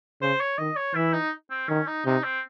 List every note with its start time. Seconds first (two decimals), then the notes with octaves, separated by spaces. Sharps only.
0.21 C#3 C5
0.40 C#5
0.58 D#3 D#5
0.76 C#5
0.95 E3 E4
1.13 D#4
1.50 C4
1.69 D#3 C#4
1.87 D#4
2.05 C3 D#4
2.24 C4